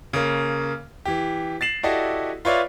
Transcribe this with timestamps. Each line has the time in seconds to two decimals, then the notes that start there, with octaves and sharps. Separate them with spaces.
0.13 C#3 A#3
1.05 E3 G4
1.61 A6 C7 E7 F#7
1.83 E4 F#4 G4 A4 D5 D#5
2.45 F4 B4 C#5 D5 E5 F5